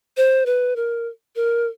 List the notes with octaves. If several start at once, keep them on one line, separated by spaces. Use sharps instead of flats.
C5
B4
A#4
A#4